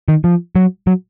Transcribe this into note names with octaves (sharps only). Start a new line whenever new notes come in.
D#3
F3
F#3
F#3